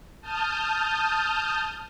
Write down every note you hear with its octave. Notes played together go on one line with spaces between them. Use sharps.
A5 D#6 F6 G6